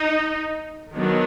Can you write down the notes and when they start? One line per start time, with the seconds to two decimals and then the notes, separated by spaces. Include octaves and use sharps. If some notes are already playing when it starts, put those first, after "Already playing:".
Already playing: D#4
0.94 D#3 F#3 B3 D4